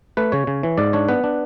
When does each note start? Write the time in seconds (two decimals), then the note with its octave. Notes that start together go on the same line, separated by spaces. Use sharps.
0.17 A3 B4
0.32 C#3 C#5
0.47 C#3
0.63 E3
0.78 G#2 D5
0.93 D4 C#5
1.09 B3 B4
1.24 D4